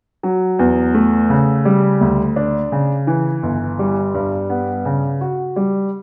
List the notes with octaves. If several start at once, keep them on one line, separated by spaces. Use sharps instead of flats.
F#3
E2
A3
C#3
G3
D2
D4
C#3
E3
G1
G3
G2
B3
C#3
F#4
G3